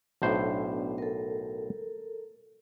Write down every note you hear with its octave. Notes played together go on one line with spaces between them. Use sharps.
B1 A2 B3 D4 C5 D5
A4 A#4